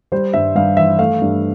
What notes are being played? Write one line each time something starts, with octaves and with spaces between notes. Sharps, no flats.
G3 C5
G2 E5
G2 F5
E3 E5
A3 F5
G2